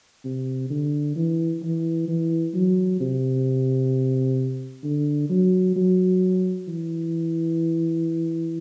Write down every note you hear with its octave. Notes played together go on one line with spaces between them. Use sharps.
C3
D3
E3
E3
E3
F#3
C3
D3
F#3
F#3
E3